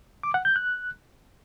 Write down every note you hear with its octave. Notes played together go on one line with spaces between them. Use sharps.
D6
F#5
G6
F#6